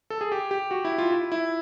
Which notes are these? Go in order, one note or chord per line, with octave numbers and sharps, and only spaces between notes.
A4
G#4
G4
G4
F#4
E4
F4
E4
E4